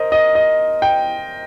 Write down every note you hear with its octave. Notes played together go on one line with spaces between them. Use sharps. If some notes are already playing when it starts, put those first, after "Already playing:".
Already playing: A#4 C5 D#5
D#5
D#5
G5